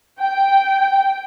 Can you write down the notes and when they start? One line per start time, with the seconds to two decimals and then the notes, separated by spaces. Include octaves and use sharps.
0.20 G5